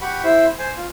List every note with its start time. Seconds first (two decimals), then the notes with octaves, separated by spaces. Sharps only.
0.02 G4 F#5 B5 C#6
0.24 E4 C5
0.59 C5 G#5
0.77 F4